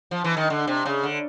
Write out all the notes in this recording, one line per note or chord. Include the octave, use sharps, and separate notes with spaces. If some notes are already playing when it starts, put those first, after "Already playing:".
F3
E3
D#3
D3
C3
C#3
D3